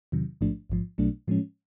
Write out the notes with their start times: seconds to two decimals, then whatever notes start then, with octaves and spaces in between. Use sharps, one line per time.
0.12 E2 C3 D#3 F#3
0.41 A1 G#2 F3 A3 D4
0.69 A1 G#2 F3
0.98 B1 B2 F#3 A3 D4
1.27 A2 F3 G#3 C#4